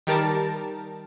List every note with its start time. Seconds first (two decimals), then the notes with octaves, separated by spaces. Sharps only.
0.07 D#3 G3 A#4 A5